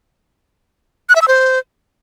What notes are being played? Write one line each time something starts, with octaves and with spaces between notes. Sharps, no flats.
F#6
E5
E6
C5